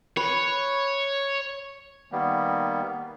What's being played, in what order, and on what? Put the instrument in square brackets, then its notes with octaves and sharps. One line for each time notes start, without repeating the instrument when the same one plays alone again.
[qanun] B4 [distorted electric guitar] C#5
[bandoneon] D#3 G3 A#3 B3